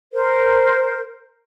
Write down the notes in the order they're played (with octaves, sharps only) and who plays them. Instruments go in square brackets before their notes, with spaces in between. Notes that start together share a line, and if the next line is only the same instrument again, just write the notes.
[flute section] A#4 C5